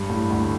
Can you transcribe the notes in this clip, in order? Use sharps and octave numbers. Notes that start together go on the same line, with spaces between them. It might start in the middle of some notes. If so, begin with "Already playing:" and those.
Already playing: G2
A2
D2 D3